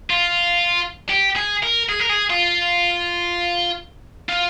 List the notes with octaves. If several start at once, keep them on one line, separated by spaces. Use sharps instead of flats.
F4
G4
G#4
A#4
G#4
A#4
G#4
F4
F4